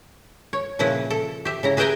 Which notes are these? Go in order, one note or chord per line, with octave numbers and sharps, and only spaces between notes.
C#5
A#2 C#3 F3 E4 B4
A4
G4 E5
C#3 E4 A#5
G#4 B4 E5 G5 G#5 A#5